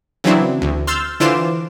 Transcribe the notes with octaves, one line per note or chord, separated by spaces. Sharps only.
C#3 E3 F#3 C4 D4 E4
D2
C6 E6 F6 G6 A6
D3 E3 F4 C5 D6 E7